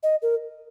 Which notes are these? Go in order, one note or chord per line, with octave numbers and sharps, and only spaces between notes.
D#5
A#4